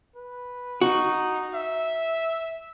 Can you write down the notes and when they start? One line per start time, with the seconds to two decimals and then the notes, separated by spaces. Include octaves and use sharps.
0.16 B4
0.82 D#4 F#4
1.55 E5